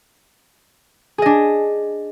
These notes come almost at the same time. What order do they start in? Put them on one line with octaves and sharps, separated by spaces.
G#4 D#5 D4